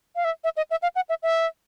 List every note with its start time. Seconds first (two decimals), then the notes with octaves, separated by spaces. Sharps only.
0.16 F5
0.25 E5
0.44 E5
0.57 D#5
0.71 E5
0.83 F5
0.95 F#5
1.09 E5
1.23 E5